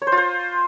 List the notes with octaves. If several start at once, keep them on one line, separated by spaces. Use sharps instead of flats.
C#5
C5
F4
C5